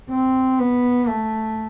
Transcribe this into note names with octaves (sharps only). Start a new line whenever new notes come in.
C4
B3
A3